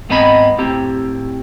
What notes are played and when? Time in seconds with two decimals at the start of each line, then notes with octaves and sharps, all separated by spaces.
0.09 G#2 B3 C4 D#5 A#5 B5
0.58 A2 C4 G4 A#5